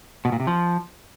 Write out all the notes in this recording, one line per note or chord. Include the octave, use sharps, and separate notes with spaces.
B2
A#2
C3
F3